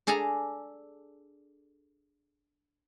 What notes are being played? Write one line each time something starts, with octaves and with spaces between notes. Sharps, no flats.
D4 G#4 A4 G#5 A#5